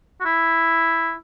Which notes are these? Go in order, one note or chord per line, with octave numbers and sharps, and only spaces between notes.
F#4
E4